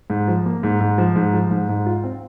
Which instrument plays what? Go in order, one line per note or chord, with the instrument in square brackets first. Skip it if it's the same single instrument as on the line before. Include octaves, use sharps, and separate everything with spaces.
[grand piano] G#2
F3
A#3
G#2
G#2
F3
G#2
F3
G#2
G#2
F4
C4